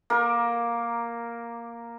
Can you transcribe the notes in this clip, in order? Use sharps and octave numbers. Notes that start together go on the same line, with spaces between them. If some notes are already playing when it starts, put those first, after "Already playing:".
A#3 A#4